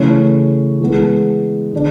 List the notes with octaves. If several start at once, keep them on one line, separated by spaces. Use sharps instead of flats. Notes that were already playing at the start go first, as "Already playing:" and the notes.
Already playing: C#3 E3 A3 C#4
E3 G#3 B3
D3 G#3 D4